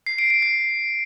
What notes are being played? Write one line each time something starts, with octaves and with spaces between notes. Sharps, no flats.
C7
D7
D7
C7